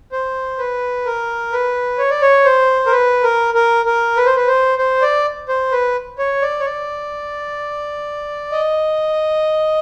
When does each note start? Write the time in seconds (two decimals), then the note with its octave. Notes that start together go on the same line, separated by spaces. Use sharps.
0.12 C5
0.58 B4
1.06 A#4
1.52 B4
1.98 C#5
2.10 D5
2.22 C#5
2.45 C5
2.87 A#4
2.92 B4
3.23 A#4
3.54 A#4
3.85 A#4
4.17 B4
4.26 C5
4.36 B4
4.47 C5
4.79 C5
5.02 D5
5.49 C5
5.72 B4
6.19 C#5
6.42 D5
6.59 C#5
6.65 D5
8.52 D#5